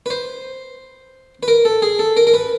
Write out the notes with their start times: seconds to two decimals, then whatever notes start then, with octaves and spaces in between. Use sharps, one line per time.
0.06 B4
0.10 C5
1.43 B4
1.48 A#4
1.65 A4
1.82 G#4
1.99 A4
2.17 A#4
2.27 A#4
2.34 B4